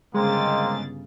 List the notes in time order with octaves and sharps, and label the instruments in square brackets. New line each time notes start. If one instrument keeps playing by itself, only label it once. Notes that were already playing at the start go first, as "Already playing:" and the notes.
[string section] G1 C#3 A6 [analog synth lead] G#3 [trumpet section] A#3 C4